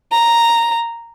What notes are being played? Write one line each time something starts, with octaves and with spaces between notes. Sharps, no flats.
A#5